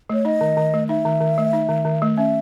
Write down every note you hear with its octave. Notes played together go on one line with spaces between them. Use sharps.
A3 C#5
D#4 D#5
D#3
D#3
A3
D#4 E5
D#3
D#3
A3
D#4
D#3
D#3
A3
C#4 E5